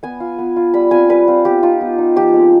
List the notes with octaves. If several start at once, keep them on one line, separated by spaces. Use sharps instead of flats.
B3 G#5
F4
B3
F4
G3 B5
C4 F4 G#5
G3 B4
C4 F4
B3 G4
D#4 F4
B3
D#4
F3 G4
G#3 C4